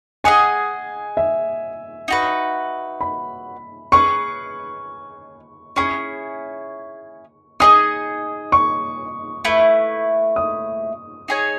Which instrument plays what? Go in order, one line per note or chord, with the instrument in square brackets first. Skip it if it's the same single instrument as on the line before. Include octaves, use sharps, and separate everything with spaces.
[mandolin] G#4 D#5 F#5 [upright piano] G#5
[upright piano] E5
[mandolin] D#4 F#4 B4
[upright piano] B5
[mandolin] C#4 G#4 B4 [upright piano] C#6
[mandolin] C#4 E4 G#4 [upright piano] C#6
[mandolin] D#4 G#4 D#5 [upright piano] D#6
[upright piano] C#6
[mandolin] A3 E4 B4
[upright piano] D#6
[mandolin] D#4 G#4 C#5 G#5